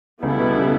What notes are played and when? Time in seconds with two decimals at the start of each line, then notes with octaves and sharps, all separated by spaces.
0.23 C#2 C#3 G3 B3 E4 A4
0.39 B2
0.55 C#3